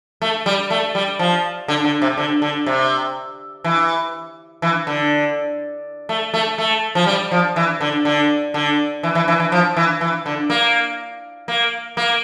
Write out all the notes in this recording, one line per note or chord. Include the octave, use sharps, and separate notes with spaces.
A3
G3
A3
G3
F3
D3
D3
C3
D3
D3
C3
E3
E3
D3
A3
A3
A3
F3
G3
F3
E3
D3
D3
D3
E3
E3
E3
E3
F3
E3
E3
D3
A#3
A#3
A#3